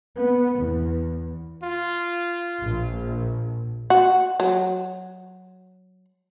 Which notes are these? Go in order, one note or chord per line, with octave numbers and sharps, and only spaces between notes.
B3
E2
F4
A#1
F#4
F#3